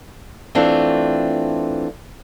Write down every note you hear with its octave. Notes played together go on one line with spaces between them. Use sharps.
E3 A3 C4 D4 F4